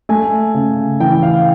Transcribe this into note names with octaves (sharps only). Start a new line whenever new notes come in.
A3 G#5
C#3
E3 G5
F5